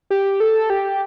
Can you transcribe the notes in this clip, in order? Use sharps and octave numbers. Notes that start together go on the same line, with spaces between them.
G4
A4
G4